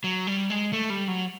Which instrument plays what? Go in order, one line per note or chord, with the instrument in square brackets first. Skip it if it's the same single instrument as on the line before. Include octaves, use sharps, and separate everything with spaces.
[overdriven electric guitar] F#3
G3
G#3
A3
G3
F#3